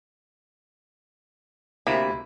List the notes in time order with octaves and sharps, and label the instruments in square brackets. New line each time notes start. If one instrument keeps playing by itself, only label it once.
[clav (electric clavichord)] D2 C3 A#3 [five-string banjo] E4